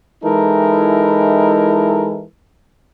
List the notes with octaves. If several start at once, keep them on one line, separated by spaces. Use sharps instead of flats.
E3 G#3 D#4 E4 A4 A#4